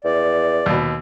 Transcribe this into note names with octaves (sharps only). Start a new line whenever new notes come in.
E2 D5
D#2 B2